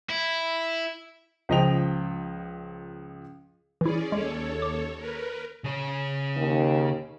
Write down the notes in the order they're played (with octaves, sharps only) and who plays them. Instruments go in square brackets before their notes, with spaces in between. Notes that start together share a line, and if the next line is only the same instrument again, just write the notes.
[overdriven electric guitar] E4
[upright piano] C#2 F3 D#5 G5 F7
[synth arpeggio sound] E3 E4 [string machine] C#4 G#4 D5
[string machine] D#2 A4 C#5 [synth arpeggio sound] G#3
[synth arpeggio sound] D6
[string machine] A#4 B4
[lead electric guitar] C#3 C#5
[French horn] D#2